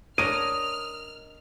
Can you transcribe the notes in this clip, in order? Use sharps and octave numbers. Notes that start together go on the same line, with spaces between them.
D4 A#4 C#5 D#5 F6 D#7